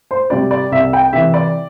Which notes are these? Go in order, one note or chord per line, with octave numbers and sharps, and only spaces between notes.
C5
C3 G3 D5
D5
C2 E5
G5
C3 E3 E5
D5